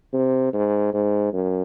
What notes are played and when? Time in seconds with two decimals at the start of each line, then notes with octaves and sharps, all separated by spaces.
0.13 C3
0.53 G#2
0.93 G#2
1.33 F#2